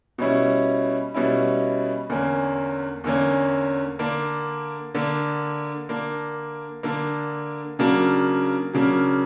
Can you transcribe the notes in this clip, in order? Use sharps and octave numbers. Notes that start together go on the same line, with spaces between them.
B2 G3 C#4 E4
B2 G3 C#4 E4
E2 D3 A#3 C#4
E2 D3 A#3 C#4
D3 A#3 D4
D3 A#3 D4
D3 A#3 D4
D3 A#3 D4
C#3 F#3 A#3 D4
C#3 F#3 A#3 D4